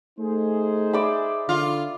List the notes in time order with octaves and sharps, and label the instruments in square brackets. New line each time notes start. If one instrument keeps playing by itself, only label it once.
[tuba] A3 [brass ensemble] D#4 G#4 C5
[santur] D5 E5 B5
[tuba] D3 [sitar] F4